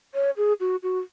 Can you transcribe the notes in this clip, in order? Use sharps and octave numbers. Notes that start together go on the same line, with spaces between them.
C#5
G#4
F#4
F#4